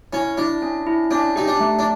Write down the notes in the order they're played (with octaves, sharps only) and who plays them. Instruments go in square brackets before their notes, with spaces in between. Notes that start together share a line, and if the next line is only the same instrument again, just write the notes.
[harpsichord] C#4 [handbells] E4
[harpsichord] D4 [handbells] E4
[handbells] C#4
E4
[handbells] C#4 [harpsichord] D4
[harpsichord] D#4 [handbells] G4
[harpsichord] D4
[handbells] A3
[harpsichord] D4